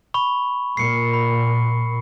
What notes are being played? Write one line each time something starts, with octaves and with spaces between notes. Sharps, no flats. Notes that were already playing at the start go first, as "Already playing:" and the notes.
B5 C#6
A#2 C7 C#7
B5